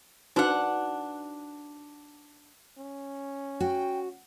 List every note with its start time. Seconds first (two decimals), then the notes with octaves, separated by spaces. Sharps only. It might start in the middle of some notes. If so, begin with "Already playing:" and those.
0.36 D4 D#4 F#4 B4 F#5
2.78 C#4
3.60 F#4 G5